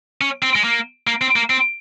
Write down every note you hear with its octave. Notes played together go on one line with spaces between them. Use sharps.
C#4
C4
G#3
A#3
A#3
C4
A#3
C4